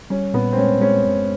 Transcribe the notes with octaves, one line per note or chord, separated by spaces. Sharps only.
G3 C#4
A#2 B3
C4
G#3 C#4
G#3 C#4
F#2